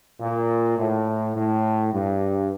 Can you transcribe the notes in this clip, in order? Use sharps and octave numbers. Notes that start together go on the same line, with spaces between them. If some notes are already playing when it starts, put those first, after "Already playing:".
A#2
A2
A2
G2